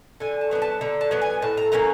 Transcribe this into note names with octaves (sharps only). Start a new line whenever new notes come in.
D3 G#5
A5
F#3 B3 D4
A5
D3 A#5
A5
F#3 B3 D4
G#5
A2 A5
A#5
F#3 A#3 C#4 A#5